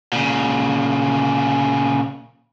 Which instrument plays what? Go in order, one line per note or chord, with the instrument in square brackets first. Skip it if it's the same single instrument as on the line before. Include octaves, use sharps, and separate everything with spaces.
[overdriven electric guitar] A#2 C#3